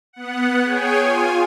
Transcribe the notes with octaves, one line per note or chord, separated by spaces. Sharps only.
B3 F#5
G#4 C#5 G5 G#5
F4 G#5